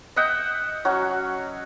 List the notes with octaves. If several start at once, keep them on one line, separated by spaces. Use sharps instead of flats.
D#5 E5 F#5 G5
F#3 C#4 F#4